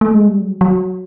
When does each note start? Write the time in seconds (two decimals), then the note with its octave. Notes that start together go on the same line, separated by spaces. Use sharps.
0.01 A3
0.14 G#3
0.28 G3
0.41 F#3
0.61 F#3